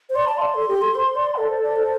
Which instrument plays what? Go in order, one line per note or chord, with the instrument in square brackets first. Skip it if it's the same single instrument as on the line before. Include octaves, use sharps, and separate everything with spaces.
[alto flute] C5
[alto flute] D5 [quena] C6
[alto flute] D5 [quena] A5
[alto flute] D5 F5 [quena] C6
[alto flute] A4
G4
A4
C5
D5
[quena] A4 [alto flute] D5
[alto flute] C5
D5
C5